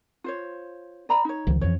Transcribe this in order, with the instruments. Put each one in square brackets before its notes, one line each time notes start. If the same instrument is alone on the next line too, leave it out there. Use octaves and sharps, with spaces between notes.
[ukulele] F4 C5 C#5
D5 A#5 B5
D#4 C#5
[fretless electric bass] C#2 D#3 F3
[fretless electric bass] F2 E3 F3 [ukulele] C#5